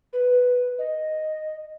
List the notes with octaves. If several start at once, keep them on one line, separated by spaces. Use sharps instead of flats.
B4
D#5